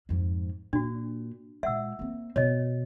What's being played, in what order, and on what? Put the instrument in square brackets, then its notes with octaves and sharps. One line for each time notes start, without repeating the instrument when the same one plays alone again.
[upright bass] F2 G#2
[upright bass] A#2 [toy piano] D4 F#4
[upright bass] A#2 G#3 [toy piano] E5 F#5 E6
[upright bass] A#3 C4
[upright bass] B2 [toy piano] C#5 D#5